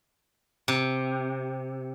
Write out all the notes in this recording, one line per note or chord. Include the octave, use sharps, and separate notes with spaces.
C3